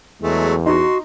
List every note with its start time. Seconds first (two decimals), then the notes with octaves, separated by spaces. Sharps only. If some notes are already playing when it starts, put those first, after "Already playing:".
0.22 E2 F#3 G#3 A3
0.66 D#4 F#4 C6